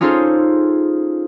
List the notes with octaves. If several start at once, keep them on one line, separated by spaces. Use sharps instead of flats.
C#4 D#4 F4 G#4 A4 C5